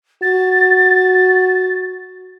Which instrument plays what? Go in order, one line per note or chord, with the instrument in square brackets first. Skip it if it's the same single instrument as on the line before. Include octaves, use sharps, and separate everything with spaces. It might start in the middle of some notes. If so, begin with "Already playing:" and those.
[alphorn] F#4 [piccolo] A6